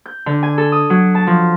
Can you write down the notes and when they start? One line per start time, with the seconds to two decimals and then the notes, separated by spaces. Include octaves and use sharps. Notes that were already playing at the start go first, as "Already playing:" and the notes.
0.06 G6
0.26 D3
0.43 G#5
0.58 A4
0.72 D#6
0.90 F#3
1.15 A5
1.27 F3